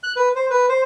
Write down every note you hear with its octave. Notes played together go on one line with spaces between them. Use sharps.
F#6
B4
C5
B4
C5